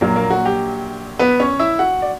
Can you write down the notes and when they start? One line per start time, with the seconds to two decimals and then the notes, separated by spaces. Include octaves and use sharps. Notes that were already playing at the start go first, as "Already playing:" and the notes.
0.01 A#1 A#2 F#3 A#3 A#4
0.16 A#3 A#4
0.30 F#4
0.46 G4
1.19 B3 B4
1.40 C#4 C#5
1.60 E4 E5
1.79 F#4 F#5
2.02 D5